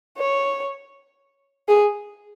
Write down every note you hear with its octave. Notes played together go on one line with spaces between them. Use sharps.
C#5
G#4